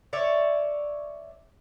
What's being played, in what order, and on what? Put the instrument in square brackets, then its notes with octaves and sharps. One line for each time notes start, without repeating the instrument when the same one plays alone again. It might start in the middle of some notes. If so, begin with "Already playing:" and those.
[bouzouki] C#5 D5 E5